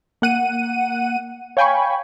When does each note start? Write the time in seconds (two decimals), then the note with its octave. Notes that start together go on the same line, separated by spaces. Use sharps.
0.22 A#3 F#5 D#7
1.57 C#5 F5 G5 G#5 B5 C#6